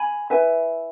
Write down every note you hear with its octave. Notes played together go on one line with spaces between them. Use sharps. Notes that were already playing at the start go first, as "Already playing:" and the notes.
Already playing: G#5 B5
E4 B4 E5 G#5